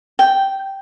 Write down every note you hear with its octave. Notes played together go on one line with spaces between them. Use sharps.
G5